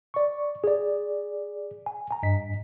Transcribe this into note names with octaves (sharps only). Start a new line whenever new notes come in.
D5 C#6
G#4 D5
G#5
G#5 A#5
G2 D#5 B6